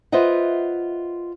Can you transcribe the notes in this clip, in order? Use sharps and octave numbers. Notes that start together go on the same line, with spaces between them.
F4 B4 C5 D#5 E5 F#5